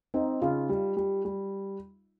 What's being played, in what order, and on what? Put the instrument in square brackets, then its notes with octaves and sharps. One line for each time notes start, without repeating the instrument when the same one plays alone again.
[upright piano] C4 [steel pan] D#4
[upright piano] C#3 [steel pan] F4
[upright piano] G3
G3
G3